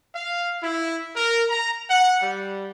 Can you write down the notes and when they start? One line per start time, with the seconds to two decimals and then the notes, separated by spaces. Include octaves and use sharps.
0.14 F5
0.62 E4
1.15 A#4
1.49 A#5
1.88 F#5
2.21 G3